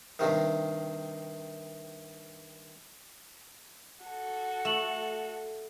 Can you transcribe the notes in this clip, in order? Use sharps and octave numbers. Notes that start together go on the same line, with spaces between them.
G2 C3 D#3
F#4 A4
A3 E7 F#7